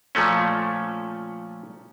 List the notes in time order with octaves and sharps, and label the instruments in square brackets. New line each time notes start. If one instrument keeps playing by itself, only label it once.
[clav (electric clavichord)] A#2 F3 A3 C#4